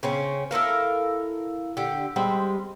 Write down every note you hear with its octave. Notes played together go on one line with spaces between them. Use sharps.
C#3 C4 C#4
E4 A4 A#4 F5
D3 G4
G3 G#3 C4